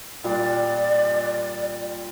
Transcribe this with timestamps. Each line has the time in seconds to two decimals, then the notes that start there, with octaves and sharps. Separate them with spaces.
0.24 A#2 G3 F4 D5